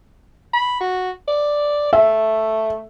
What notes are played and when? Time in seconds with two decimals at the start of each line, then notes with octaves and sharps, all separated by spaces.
0.53 B5
0.80 F#4
1.28 D5
1.93 A3 E5